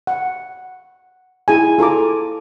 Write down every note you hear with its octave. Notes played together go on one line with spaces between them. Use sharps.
F#5
E4 G#4 G#5
F4 A4 A#5 D6